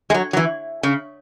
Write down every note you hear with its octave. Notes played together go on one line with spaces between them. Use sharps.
G#3
F#3
F#3
E3
C#3